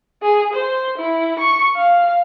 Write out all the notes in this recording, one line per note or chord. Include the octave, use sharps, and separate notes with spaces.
G#4
C5
E4
C#6
F5